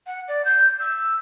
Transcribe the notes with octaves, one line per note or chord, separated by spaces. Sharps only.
F#5
D5
G6
E6